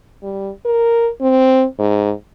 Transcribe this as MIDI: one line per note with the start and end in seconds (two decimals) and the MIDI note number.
0.23 0.50 55
0.65 1.09 70
1.21 1.65 60
1.79 2.12 44